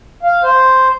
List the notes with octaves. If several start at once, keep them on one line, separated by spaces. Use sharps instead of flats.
F5
C5